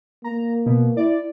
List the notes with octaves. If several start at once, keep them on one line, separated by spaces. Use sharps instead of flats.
A#3 A#5
B2
E4 D5